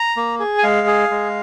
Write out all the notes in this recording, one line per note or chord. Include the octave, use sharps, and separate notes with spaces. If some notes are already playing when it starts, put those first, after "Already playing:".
Already playing: A#5
A#3
G#4
G#5
G#3 F5
G#4
G#3